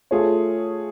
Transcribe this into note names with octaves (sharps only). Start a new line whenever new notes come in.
A3 F4 G#4 C#5